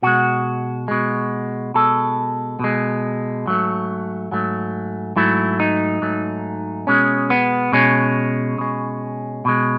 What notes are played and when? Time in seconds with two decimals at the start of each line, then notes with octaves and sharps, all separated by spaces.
0.02 B2 G#3 F#4
0.88 B2 G#3
1.74 B2 G#3 A4
2.60 B2 G#3
3.46 G#2 F#3 A3
4.31 G#2 F#3 A3
5.16 G#2 F#3 A3 E4
5.60 D#4
6.02 G#2 F#3 A3
6.87 B2 G#3 C#4
7.30 B3
7.73 B2 G#3 C#4
8.58 B2 G#3
9.45 B2 G#3